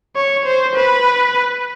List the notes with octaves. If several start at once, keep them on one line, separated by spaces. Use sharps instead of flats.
C#5
C5
B4